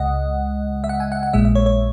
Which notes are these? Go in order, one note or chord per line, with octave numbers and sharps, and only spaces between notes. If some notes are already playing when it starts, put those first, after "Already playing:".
Already playing: C#2 C#3 G#3 D#5 F#5
E5
F#5
G#5
F#5
F#5
A#1 A#2 G#3 E5
E5
C#5
C#5